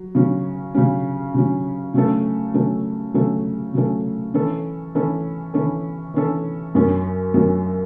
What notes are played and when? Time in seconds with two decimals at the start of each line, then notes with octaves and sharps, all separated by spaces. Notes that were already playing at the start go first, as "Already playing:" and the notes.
Already playing: F#3
0.15 C#3 F#3 C#4
0.74 C#3 F#3 C#4
1.34 C#3 F#3 C#4
1.94 C#3 F#3 A3 C#4 A4
2.54 C#3 F#3 A3 C#4 A4
3.14 C#3 F#3 A3 C#4 A4
3.74 C#3 F#3 A3 C#4 A4
4.34 E3 C#4 A4
4.95 E3 C#4 A4
5.54 E3 C#4 A4
6.14 E3 C#4 A4
6.75 F#2 F#3 C#4
7.34 F#2 F#3 C#4